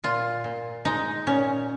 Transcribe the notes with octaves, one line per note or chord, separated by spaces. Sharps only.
A#2 F4
A#2
G#3 D#4
A#2 C#4